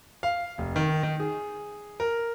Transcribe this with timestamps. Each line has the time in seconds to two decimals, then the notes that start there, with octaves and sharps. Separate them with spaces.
0.23 F5
0.58 F1
0.76 D#3
1.03 D#3
1.20 G#4
2.00 A#4